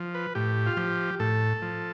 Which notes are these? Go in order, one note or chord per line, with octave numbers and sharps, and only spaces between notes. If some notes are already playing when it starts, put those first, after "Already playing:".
Already playing: F3
B4
A2 G4
F4
F3 G4
A2 A4
F3